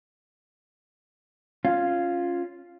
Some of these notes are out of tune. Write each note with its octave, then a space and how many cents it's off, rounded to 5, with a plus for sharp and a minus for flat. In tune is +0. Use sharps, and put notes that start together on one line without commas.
C#4 +0 F4 +0